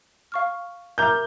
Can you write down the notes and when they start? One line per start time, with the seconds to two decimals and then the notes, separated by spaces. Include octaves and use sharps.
0.32 F5 C#6 F6
0.98 A#4 E5 A#5 D6 F6 G6